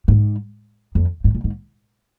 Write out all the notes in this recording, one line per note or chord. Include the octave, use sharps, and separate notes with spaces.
G#2
F2
G#2
A#2
G#2